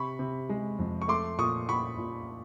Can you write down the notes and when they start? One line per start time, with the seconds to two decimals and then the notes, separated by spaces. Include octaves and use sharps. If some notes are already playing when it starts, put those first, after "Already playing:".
Already playing: C3 B5 C#6
0.19 C3
0.49 G#3
0.79 F2
1.02 C#6
1.08 A3 C6 D6
1.38 A#2 C#6 D#6
1.69 A#2 B5 C#6
1.98 A#2